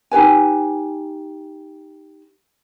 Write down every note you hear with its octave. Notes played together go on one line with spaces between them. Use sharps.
D#4 G4 B4 G#5